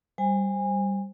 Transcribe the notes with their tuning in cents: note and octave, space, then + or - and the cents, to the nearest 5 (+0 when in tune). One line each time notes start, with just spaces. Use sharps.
G3 +0 C5 +5 G#5 -25